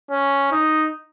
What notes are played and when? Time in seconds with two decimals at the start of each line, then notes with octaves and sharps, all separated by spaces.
0.11 C#4
0.52 D#4